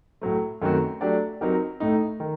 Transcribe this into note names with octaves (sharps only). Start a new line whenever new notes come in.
A2 F#3 A3
F#2 D#3 A3 C4 F#4
F#3 A3 D4 G4 D5
F#3 C4 D#4 G4 A#4
A2 A3 D#4
D#3